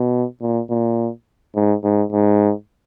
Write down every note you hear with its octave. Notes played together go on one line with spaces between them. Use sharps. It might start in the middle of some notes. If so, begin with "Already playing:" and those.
Already playing: B2
A#2
A#2
G#2
G#2
G#2